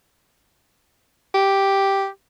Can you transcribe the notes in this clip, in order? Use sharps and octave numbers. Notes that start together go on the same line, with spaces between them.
G4